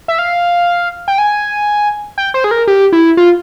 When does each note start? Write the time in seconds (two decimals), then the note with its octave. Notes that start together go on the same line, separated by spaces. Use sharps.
0.08 E5
0.19 F5
1.08 G5
1.18 G#5
2.18 G5
2.34 C5
2.44 G#4
2.51 A#4
2.67 G4
2.93 E4
3.17 F4